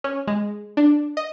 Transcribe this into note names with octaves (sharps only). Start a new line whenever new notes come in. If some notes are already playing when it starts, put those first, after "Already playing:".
C#4
G#3
D4
D#5